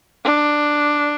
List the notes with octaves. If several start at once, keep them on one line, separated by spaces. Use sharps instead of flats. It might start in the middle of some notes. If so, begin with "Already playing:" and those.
D4